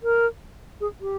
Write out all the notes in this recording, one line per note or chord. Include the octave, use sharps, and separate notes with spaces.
A#4
G#4
G4